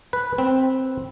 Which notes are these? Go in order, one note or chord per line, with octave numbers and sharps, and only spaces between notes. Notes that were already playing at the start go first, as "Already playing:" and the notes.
B4
C4